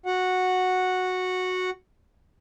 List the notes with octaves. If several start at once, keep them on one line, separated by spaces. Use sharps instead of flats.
F#4 F#5